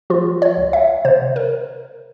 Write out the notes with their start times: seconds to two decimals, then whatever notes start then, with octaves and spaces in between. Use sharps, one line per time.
0.10 F3 F4
0.42 C#5
0.57 C#2
0.73 E5
1.05 C3 C5
1.36 A#4